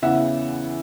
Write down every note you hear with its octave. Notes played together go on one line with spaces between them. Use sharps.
E2 C#3 E3 E5 F#5